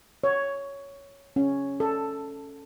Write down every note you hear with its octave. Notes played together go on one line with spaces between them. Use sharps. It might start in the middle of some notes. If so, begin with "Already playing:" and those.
C#5
C#4
A4